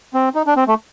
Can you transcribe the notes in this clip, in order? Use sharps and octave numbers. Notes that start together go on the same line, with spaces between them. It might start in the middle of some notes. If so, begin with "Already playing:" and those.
C4
D#4
D4
C4
A3